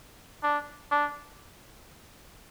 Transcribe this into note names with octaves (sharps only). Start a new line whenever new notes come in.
D4
D4